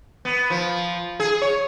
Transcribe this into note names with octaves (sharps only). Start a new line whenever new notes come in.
B3
F3
G#4
C#5